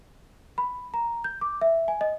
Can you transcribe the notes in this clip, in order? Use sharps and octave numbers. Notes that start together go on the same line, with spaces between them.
B5
A#5
G6
D6
E5
G#5
D#5